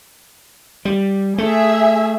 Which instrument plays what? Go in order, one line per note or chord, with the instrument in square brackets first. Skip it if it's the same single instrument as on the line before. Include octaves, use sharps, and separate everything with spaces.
[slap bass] G3
[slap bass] A3 [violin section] G#4 E5